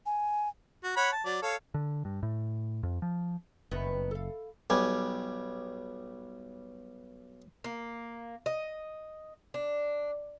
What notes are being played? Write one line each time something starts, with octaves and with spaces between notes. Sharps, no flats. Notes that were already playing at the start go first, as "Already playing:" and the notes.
G#5
F#4
C#5 F#5 B5
A5
F#3 D5
A4 C#5 F5
D3
G2
A2
F2
F3
F#1 G2 D#3 B3
A4 F5
B1 G3 G#5
A#3
D#5
D4